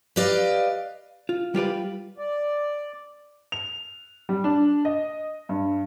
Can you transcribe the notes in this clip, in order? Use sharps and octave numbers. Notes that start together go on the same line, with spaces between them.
G4 B4 D5 D#5 F5
F4
G3 F4 G4 B4
D5
F7
G3
D4
D#5
G2